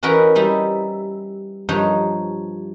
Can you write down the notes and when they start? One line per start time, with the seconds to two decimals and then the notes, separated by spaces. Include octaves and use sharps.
0.03 E3 C#4 D#4 F#4 A#4 B4
0.35 G3 D#4 E4
1.69 G2 F3 D#4 C#5